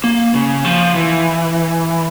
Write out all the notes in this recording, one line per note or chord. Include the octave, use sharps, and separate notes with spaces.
A#3
C#3
F3
E3